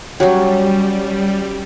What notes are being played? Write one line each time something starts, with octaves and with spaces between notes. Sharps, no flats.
F#3 G3 C#4 F#4 G4